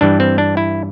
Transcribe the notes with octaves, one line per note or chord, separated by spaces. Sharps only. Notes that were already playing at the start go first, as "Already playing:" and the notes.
G2 E3 G3 D4
C4
D4
E4